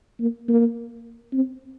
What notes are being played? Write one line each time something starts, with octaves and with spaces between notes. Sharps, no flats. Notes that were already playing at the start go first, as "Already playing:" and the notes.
A#3
A#3
C4